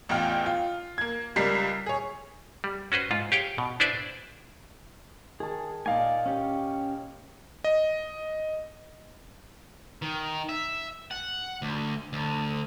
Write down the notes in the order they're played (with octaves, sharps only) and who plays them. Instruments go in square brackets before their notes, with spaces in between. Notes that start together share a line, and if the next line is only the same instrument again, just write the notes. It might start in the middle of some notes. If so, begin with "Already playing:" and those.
[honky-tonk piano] A1 E2 F4 G5 F6
F4
A#3 G#6
C#2 G3 A#4 B6 C7
G#4 C#5
[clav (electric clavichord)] G3
C#4 F#4 B4 C5
G#2 F4
G4 G#4 C#5 F5 G5
B2
D4 E4 B4 C5 D5 E5
[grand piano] D#3 A5 [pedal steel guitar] G#4
[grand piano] A#2 D#4 F5 [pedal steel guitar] D5 G#5
[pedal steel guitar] C#4 G4
[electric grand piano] D#5
[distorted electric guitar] D#3
E5
F#5
D2
D2